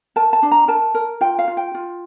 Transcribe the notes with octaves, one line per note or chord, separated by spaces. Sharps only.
A#4 A5
A5
D4
A#5
A#4 A5
A#4
F4 G5
F5
F4
G5
F4